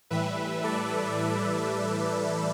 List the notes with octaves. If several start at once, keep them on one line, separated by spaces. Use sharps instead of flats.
A2 E3 G3 B4 E5
A4 D5
A4 D5